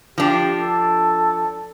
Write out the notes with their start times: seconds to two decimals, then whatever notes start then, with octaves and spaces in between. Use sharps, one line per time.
0.18 F3 D4 G4
0.58 A4